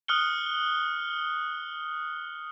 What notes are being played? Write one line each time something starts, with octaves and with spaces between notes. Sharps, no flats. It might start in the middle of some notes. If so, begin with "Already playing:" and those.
D#6 F6 F#6 C#7 G7